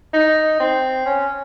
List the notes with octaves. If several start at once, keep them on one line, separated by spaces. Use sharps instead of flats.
D#4
C4
C#4